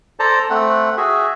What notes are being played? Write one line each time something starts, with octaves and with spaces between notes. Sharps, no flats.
A4 C5 D5 A5 A#5
A3 C4 F#5
F#4 G#4 E5